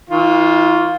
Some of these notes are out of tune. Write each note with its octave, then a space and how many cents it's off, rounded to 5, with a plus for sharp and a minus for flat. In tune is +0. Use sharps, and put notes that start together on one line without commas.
E3 -45 F4 +5